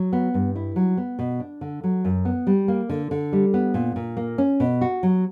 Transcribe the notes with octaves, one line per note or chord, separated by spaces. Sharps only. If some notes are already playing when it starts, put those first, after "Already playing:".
Already playing: F#3
B3
G2
E4
F#3
B3
B2
D4
D3
F#3
F#2
B3
G3
A#3
D3
D3
G3
B3
A#2
A#2
A#3
C#4
B2
F#4
F#3